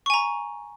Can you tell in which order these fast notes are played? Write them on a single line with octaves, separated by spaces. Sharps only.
C#6 G#5 A#5